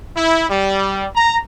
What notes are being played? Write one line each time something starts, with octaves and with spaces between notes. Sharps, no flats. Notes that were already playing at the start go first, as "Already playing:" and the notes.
E4
G3
A#5